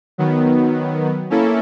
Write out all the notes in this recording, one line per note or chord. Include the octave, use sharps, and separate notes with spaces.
D#3 F#3 B3
A#3 C#4 E4 A4